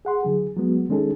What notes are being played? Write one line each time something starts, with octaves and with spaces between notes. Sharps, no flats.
G#4 F#5 C6
D3 F#3 G#4
F#3 G#3 B3 F#4
D#3 G#3 C#4 D#4 G#4 A4